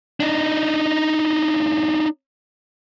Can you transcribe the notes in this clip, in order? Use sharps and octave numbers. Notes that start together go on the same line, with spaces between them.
D4 D#4